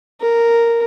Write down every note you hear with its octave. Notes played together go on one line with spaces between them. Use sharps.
A#4